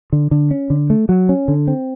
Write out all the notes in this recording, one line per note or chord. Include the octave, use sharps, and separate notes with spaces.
D3
D3
C#4
D3
A3
F#3
C#4
D3
C4